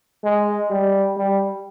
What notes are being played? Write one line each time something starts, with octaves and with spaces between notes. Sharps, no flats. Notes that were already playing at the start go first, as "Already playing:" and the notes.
G#3
G3
G3